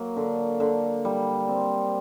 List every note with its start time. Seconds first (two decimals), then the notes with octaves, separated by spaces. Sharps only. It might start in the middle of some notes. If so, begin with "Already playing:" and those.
Already playing: F#3 A#3
0.16 D3
0.60 D3
1.05 G3
1.48 C4